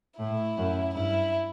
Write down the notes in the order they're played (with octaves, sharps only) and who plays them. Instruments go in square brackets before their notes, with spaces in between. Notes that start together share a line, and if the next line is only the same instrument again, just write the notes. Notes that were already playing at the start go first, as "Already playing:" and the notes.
[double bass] A2 [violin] E4
[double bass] F#2
[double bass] G2 [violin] E4